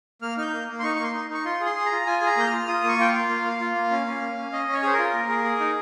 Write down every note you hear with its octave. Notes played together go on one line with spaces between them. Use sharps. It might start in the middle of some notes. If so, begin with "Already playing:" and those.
A#3 F6
D#4 F6 G6
A#3
A#3
C6
D#4 C#6
C#6
A#3 C6
D#4
D#4 C#6
F4 C6
G#4
C6
G#4
A#5
F4
F4 G#5
G#4
A#5
A#3 G6
F6
F4
F4 D#6
A#3 C#6
F4 G5
F5
F4
A#3
A#3
F4
A#3
C#4
C#4
A#3
C#4
C#4 D#5
C#4
C#5
G#4 C5
A#4
F4
A#3
G#4
G#4
D#4